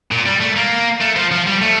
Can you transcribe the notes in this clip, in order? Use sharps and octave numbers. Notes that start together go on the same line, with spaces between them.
A#2
G3
A3
A#3
A3
F3
F3
G3
A3